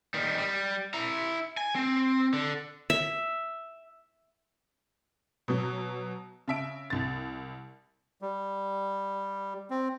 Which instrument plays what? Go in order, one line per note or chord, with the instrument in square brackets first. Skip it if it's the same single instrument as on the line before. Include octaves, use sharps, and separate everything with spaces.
[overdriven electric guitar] D#3 G3
G3
E4 A#5
G#5
C4
D3
[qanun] E5
[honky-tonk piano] B2 F#3
C#3 E5 D7
C2 A6
[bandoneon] G3
C4